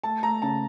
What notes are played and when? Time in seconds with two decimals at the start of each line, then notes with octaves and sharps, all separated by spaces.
0.03 A3 A5
0.23 A3 A#5
0.42 C#3 A5